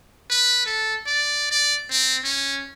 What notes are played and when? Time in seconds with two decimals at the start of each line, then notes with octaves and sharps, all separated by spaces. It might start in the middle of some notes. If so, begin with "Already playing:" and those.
0.30 B4
0.66 A4
1.06 D5
1.51 D5
1.90 C4
2.24 C#4